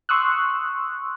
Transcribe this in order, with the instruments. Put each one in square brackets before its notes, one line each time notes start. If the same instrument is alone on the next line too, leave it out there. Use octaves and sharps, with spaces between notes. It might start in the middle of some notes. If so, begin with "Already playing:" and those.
[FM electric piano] C6 C#6 D#6 E6 F#6